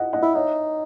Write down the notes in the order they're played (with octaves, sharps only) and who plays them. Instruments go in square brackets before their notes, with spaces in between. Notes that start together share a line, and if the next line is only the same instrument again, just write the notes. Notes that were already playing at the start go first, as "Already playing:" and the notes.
Already playing: [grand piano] D#5 F#5
D#5 F#5
[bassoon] E4
[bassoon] D#4 [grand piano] C#5 E5